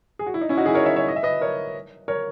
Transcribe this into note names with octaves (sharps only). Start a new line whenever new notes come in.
G#4
F#4
E4
D#4
C#4 E4
D#4 F#4
E4 G#4
A#4 C#5
C#5 E5
C#5 E5
D#5
E5
B4 D#5
A#4 C#5
A#4 C#5